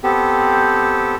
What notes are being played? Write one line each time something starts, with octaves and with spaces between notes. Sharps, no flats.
B3 C4 G4 A4